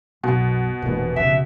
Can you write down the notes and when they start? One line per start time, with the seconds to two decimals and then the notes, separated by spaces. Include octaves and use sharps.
0.23 B1 F#2 B2
0.82 F1 A#2 E3
1.16 C#3 E5